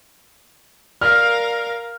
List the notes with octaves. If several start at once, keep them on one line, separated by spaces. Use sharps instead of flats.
A#4 D5 F5 F6